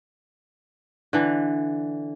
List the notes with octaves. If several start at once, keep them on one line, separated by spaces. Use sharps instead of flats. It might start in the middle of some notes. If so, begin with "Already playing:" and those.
D3 E3